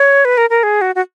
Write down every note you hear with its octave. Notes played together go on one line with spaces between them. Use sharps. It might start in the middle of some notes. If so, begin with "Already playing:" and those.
Already playing: C#5
B4
A#4
A#4
G#4
F#4
F#4